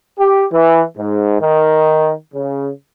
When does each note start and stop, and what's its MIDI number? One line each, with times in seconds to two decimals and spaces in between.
0.19 0.45 67
0.52 0.83 52
0.98 1.38 44
1.41 2.13 51
2.34 2.70 49